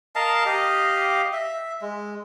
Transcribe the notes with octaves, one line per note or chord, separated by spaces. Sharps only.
A#4 D#5 F5 A5
G4 D#5 F5
E5
G#3